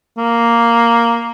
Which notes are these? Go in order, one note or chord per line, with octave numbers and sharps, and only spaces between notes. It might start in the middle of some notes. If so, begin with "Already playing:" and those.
A#3